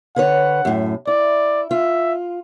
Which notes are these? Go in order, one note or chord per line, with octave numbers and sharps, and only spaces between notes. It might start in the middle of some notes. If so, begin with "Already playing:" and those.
D3 B4 C#5 F#5
F#2 A2
E4 D5
F4 E5